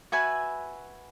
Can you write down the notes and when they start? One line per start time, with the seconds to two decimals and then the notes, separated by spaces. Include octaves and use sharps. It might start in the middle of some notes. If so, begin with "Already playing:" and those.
0.12 F#4 B4 E5 G#5